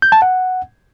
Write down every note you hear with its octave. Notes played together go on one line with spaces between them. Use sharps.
G6
A5
F#5